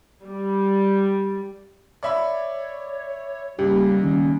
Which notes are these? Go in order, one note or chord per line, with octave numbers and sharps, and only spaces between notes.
G3
C#5 D5 E5 B5
C#2 G3 A#3 G4
D#3 C#4